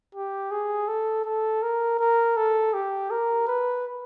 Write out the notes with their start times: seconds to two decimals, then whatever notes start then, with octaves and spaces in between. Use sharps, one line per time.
0.15 G4
0.51 G#4
0.88 A4
1.25 A4
1.63 A#4
1.99 A#4
2.37 A4
2.74 G4
3.11 A#4
3.47 B4